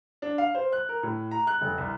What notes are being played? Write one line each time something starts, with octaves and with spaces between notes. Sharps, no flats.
D4
F5
C5
F#6
A#4
A2
A#5
F#6
F1
C2